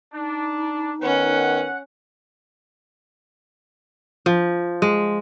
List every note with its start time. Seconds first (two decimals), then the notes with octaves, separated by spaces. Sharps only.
0.13 D4 D#4
1.02 D#3 B3 C#4 F#5
4.26 F3
4.82 G#3